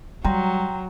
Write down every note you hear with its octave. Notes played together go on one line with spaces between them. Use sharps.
F#3 G3 G5 A#5 C6